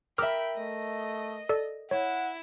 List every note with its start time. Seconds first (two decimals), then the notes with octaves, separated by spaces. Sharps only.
0.18 A#4 E5 G5 B5 D6 E6 F6
0.57 A3 D#5
1.49 A4 D5
1.91 E4 C#5 F#5